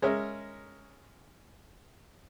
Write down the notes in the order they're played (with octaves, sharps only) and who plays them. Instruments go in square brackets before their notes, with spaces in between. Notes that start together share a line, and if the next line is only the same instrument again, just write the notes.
[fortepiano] G#3 C#4 A#4 E5